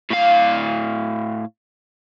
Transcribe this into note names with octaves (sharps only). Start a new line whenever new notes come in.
A2 F5